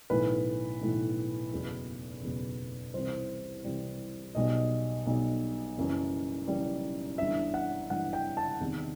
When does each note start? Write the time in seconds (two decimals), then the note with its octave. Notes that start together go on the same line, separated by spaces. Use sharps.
0.10 B1 A2 E3 B4
0.81 B1 A2 E3
1.53 F#1 E2 B2
2.22 F#1 E2 B2
2.94 C2 C3 E3 G3 C5
3.64 C2 C3 E3 G3
4.35 B1 B2 G3 D#5
5.06 B1 B2 G3
5.77 F#1 F#2 E3 G3
6.48 F#1 F#2 E3 G3
7.18 G1 G2 E3 E5
7.54 F#5
7.90 G1 G2 E3 F#5
8.13 G5
8.37 A5
8.60 E2 C3 D#3 G3